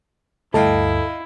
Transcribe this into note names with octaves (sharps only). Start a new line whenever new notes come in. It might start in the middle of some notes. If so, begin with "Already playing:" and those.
D2 G2 E4 A4 D#5 F5 G5